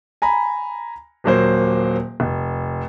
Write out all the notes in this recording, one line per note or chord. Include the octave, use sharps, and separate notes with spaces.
G#5 A#5 B5
D#1 F#3 A#3 C5
F1